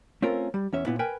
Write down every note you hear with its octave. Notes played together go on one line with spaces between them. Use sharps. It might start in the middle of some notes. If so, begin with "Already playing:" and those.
A3 C4 C#4 F4 A#4
G3
E2 C#4 E5
A#2 B3 E4
A#4 B4 G5 G#5